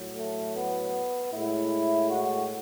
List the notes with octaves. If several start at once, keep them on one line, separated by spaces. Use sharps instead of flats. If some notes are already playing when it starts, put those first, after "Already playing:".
Already playing: A2 F#3
A3
B3
A2 G#3 E4
F#4